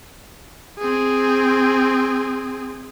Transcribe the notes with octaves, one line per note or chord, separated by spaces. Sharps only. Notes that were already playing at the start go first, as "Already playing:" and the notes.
C4 G#4